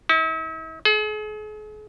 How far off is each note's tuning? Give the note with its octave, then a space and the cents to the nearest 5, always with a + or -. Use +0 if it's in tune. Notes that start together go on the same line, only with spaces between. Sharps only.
E4 -45
G#4 +40